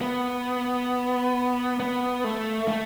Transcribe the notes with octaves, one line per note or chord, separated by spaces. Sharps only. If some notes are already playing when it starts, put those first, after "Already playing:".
B3
B3
A3
A3